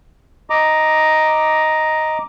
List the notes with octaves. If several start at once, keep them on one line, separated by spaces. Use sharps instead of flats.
D#5 A#5 D6